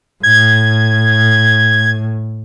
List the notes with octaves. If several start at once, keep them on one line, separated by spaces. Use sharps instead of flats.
A2 G#6